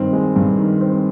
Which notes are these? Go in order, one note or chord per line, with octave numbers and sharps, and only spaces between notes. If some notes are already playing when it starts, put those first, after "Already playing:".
Already playing: G2 D#3 C4
G#3
G2
D#3
C4